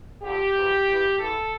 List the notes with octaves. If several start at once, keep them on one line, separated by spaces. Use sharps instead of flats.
F2 D3 F3 G4
E2 C3 F3
E2 E3
E2 E3 A4